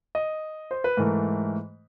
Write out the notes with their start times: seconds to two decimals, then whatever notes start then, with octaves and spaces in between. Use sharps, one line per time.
0.15 D#5
0.71 C5
0.84 B4
0.97 G#2 E3 A3 A#4